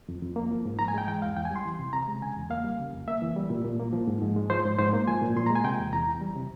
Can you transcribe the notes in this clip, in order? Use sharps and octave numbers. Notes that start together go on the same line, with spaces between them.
F2
F2
A#3
F3
G#2
G#2 A#5
G#5
G#3 G5
E3 G5
E2 F5
E2 G5
G#5
G3
C6
E3
C3
C3 A#5
G#3
C#3 G#5
E2
A#3 F5
G3
C#3
F2
A#3 E5
E3
G3
A#2
A#2
A#3
F3
G#2
G#2
G#3
F3 C5
G#2
G#2 C5
A#3
F3 G#5
A#2
A#2 C6
G#3 A#5
G#5
C3 G5
E2
E2 A#5
E3
G3
C3